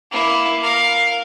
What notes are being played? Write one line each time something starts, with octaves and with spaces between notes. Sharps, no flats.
A#3 E4
A#4 F5